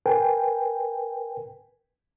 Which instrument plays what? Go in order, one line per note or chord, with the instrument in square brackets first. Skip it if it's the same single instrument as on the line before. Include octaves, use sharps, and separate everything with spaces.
[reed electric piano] A#4 B4 G5 G#5